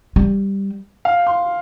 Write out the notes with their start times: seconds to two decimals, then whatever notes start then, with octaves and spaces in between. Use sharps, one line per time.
0.16 G3
1.05 F5
1.27 C6